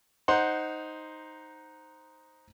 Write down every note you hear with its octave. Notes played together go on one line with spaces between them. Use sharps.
D#4 C5 F#5 C6